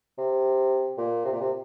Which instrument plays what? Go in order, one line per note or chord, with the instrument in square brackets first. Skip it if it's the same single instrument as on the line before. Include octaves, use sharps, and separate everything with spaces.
[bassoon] C3
A#2
C3
A#2
C3